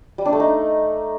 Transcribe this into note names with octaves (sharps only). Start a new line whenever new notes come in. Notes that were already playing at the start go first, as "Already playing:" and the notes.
G3
D4
A3
D#4